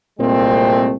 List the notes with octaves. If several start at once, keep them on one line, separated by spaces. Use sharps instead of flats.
C2 A#2 G#3 A3 C4